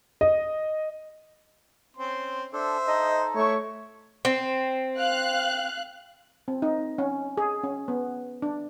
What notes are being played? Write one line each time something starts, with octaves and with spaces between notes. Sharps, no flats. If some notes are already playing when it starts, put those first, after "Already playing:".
D#5
C4 C#4 C6
D4 A4 C5 E5
D#4 A4 D#5
A3 E4 C#5 C#6
C4
F5 F#6
C4
D#4
C#4
G#4
C#4
B3
D4